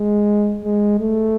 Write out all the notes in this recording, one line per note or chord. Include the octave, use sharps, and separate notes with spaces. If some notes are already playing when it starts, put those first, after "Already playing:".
Already playing: G#3
G#3
A3